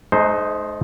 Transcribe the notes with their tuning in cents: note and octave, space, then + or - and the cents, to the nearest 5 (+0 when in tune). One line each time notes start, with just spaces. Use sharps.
A3 -40 D#4 +0 C5 +0